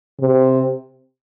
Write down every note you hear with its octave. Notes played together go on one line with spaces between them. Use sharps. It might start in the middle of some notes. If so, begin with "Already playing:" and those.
C3